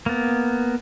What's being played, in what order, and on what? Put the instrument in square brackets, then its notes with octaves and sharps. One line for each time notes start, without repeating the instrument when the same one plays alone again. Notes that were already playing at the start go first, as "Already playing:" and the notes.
[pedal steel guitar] A#3 B3